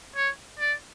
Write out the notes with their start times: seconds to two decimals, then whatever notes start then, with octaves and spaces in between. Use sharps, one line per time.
0.16 C#5
0.60 D5